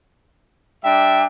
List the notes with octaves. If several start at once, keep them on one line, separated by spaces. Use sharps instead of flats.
G3 D4 E5 G5